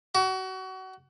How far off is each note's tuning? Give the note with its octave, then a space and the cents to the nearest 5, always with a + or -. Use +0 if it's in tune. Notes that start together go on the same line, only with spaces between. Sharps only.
F#4 +30